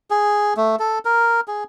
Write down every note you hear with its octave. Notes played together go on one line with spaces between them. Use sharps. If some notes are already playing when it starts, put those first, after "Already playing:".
G#4
A3
A4
A#4
G#4